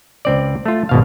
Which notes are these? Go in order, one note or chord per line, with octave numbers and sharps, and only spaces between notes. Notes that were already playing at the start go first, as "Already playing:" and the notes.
C#2 C4 D5
A3 F4
G#1 B2 F5